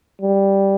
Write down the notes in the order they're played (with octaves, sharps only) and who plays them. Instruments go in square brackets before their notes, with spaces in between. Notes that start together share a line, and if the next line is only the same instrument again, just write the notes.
[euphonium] G3